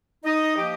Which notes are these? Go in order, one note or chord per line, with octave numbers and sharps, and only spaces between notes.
D#4 D#5
F3 A#3 G4